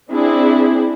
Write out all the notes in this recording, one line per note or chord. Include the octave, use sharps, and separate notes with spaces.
C4 D4 E4 G#4